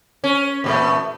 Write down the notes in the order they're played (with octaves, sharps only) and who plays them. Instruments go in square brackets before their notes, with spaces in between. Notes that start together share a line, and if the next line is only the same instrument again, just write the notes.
[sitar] C#4
E2 A#2 A3